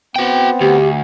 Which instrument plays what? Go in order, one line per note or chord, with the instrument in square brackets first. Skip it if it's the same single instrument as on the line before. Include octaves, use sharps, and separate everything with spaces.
[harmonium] B3 C4 [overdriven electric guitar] F#4 G5
[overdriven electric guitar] D2 [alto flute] G4